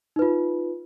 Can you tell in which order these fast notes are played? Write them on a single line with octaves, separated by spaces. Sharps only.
D#4 B4 F4